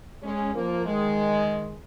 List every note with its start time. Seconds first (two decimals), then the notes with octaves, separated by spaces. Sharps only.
0.22 G#3 C#4
0.54 F3 A#3
0.86 D#3 G#3